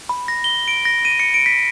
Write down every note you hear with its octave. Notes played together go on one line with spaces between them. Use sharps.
B5
A#6
G7
D7
A#6
D#7
C#7
D7
B6